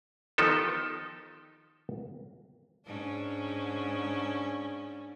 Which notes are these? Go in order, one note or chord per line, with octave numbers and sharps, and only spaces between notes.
D#3 F3 B3 D#4 G4 A4
G#2 C#4 D4